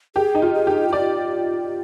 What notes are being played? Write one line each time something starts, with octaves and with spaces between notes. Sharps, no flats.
G4 G#4
D#4
F4
G#4
G4
D#4
F4 D5